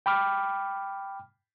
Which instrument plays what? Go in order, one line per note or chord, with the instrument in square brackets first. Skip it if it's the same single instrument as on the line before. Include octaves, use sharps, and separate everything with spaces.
[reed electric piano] G5 B5 D6 F6